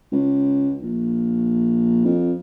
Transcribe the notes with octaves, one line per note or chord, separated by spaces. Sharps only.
C#2
A#1
F2